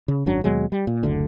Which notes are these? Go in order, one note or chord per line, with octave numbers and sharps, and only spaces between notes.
C#3
G#1 F#2 F#3 D4
D#2 B2 F#3 G#3
G3
A#2
F#1 D2 D3